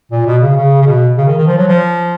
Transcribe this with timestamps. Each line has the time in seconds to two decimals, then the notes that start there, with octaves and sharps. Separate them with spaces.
0.12 A#2
0.26 B2
0.42 C#3
0.57 C#3
0.82 C#3
0.86 B2
1.18 C#3
1.28 D#3
1.38 D#3
1.47 F3
1.58 F#3
1.68 F3